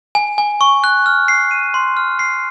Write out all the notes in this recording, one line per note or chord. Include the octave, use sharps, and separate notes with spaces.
G#5
G#5
C#6
F#6
F6
C7
D#7
C6
F6
C7